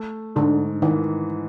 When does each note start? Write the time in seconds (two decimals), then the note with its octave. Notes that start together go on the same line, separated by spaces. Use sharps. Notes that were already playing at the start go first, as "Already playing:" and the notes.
Already playing: A3
0.36 G#2 D3
0.82 D#3 E3